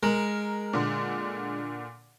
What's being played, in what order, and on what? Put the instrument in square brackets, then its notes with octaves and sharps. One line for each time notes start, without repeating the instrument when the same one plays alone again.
[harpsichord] G#3 [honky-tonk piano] A#4
[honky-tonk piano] A#2 D3